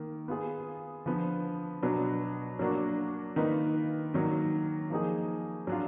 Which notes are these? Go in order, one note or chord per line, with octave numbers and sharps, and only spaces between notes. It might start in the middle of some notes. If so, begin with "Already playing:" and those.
Already playing: D#3 A#3
B3 F4 G#4
D3 F3 B3
B2 F#3 B3 D4
F#3 A#3 D4 F#4
D#3 A#3 F4 B4 D#5
D#3 F#3 A#3
F3 A#3 D#4 G#4
F#3 D4 F4